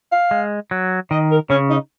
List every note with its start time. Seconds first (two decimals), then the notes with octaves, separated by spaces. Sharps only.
0.12 F5
0.31 G#3
0.71 F#3
1.11 D#3 D#5
1.31 A#4
1.50 C#3 C#4
1.70 D#4